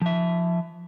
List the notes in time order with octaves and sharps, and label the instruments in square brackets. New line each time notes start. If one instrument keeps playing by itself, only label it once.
[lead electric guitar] F3 E5